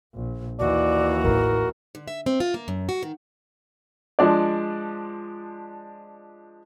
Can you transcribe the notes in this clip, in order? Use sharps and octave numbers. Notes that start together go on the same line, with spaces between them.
A#1
D#2 E3 F#4 D5
A1 A2 A#4
D3
E5
C4
F4
A#3
F#2
F#4
D#3
F3 G#3 D4 D5